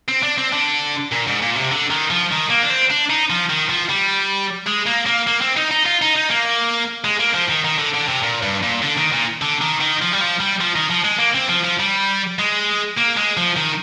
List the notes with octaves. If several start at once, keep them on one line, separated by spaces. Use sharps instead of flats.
C4
D4
C4
D3
A#2
G#2
A#2
C3
D3
D#3
F3
D#3
A#3
D4
C4
D4
D#4
F3
D#3
F3
G3
G#3
A#3
A#3
A#3
C4
D#4
D#4
F4
D#4
D#4
A#3
G#3
A#3
F3
D#3
D#3
D3
D3
C3
A#2
G2
A#2
D3
D#3
A#2
D3
D#3
D#3
F3
G3
F3
G3
F3
D#3
F3
G#3
A#3
C4
F3
F3
G3
G#3
A#3
G#3
F3
D#3